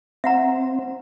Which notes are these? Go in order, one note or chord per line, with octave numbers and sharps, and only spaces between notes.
C4 E5 F#5 A#5